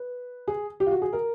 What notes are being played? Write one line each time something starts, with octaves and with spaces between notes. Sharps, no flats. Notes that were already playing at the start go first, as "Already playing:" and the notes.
Already playing: B4
G#4
G4
F4
F#4
G#4
A#4